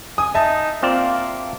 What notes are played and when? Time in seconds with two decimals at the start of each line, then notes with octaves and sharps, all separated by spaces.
0.18 G#5 D#6
0.35 D#4 E5 A5
0.83 A#3 C4 F4 D5